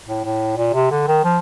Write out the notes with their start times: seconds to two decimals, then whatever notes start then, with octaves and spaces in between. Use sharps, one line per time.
0.08 A2
0.25 A2
0.57 A#2
0.74 C3
0.91 D3
1.07 D#3
1.24 F3